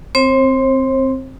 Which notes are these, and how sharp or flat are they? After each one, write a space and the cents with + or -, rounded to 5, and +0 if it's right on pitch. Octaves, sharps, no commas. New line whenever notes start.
C4 +0 C5 +40